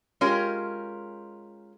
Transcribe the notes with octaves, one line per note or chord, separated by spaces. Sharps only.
G#3 C#4 F4 G4 A#4